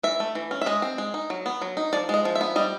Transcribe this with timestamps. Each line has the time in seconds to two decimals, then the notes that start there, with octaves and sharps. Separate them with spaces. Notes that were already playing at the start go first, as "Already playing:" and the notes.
0.03 E3 E5
0.20 A3
0.35 E3
0.51 C#4
0.61 E5
0.66 G#3 D#5
0.82 C4
0.98 G#3
1.14 D#4
1.30 F#3
1.46 B3
1.61 F#3
1.77 D#4
1.93 F3 D5
2.09 G#3 D#5
2.25 F3
2.35 E5
2.41 B3
2.56 G3 D#5